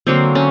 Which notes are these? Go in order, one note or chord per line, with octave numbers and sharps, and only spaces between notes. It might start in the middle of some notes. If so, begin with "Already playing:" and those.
D3 F#3 A#3 C4
C#4